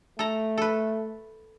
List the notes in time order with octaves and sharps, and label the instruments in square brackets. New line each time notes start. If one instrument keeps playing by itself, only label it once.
[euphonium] A3 [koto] A4 A#5
[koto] A4 B4